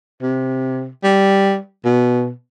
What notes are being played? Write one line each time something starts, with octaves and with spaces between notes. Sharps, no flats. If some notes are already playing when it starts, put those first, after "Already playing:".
C3
G3
B2